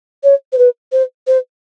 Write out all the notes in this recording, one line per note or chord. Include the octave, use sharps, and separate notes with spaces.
C#5
C5
B4
C5
C5